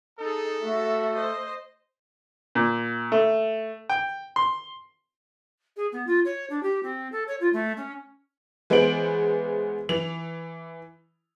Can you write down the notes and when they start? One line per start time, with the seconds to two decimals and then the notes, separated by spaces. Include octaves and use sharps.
0.19 D#4 G#4 A4
0.61 A3 F#4 E5
1.15 C5 D#5
2.55 A#2
3.12 A3
3.90 G5
4.36 C6
5.77 G#4
5.92 B3
6.07 F4
6.25 C#5
6.50 D4
6.63 G4
6.83 C4
7.12 A4
7.28 C#5
7.40 F4
7.53 A3
7.77 C#4
8.70 E3 G#3 B3 C5 D7 F#7
9.89 E3 F7